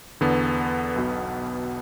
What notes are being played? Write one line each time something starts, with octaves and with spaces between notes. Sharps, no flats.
E2 D3 B3
B1 B2